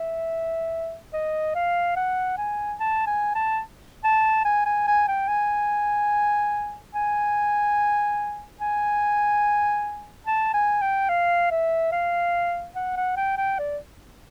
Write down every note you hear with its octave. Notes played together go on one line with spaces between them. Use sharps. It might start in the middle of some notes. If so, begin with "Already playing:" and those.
Already playing: E5
D#5
F5
F#5
G#5
A5
G#5
A5
A5
G#5
G#5
G#5
G5
G#5
G#5
G#5
A5
G#5
G5
F5
E5
F5
F#5
F#5
G5
G5
D5